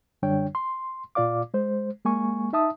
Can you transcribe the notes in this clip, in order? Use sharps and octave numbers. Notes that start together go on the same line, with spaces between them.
F#2 D3 G3 D4 C#5 G5
C6
A#2 F4 D5 F5 D6
G#3 C5
G#3 A#3 G#5 C#6
D#4 E5 A5 D#6